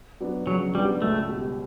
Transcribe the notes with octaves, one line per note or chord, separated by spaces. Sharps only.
F#3 B3 D4
C#3 F#3
F#3 G3 B3 D4
C#2 A3
B2 G3